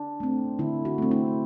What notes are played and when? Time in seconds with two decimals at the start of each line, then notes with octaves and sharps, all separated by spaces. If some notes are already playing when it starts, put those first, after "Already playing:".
Already playing: D4
0.20 A3 C4
0.59 D3 E4
0.85 F#4
0.98 A3 C4
1.11 E4